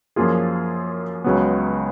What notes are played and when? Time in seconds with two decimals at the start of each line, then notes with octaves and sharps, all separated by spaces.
0.16 F#2 F3 A#3 F4 G#4
1.24 C#2 C#3 F#3 B3